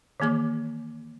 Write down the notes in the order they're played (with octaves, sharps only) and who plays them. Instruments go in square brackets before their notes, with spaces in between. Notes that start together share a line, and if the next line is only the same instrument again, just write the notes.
[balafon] D#3 E3 A#3 G#4 D6